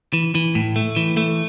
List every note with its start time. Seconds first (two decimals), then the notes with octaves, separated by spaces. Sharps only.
0.13 E3
0.35 E3
0.55 A2
0.76 A3
0.96 E3
1.17 A3